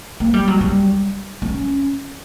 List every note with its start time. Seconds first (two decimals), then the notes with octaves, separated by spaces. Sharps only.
0.20 A#3
0.34 G3
0.48 F#3
0.61 G3
1.42 C#4